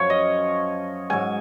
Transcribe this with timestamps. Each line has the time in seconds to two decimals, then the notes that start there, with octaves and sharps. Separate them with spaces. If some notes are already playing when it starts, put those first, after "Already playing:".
Already playing: F#2 F3 C#5
0.10 D#5
1.10 G#2 F#3 G#5